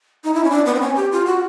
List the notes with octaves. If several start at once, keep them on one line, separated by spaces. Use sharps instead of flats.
D#4
E4
C#4
D4
B3
C4
C#4
G4
F4
F#4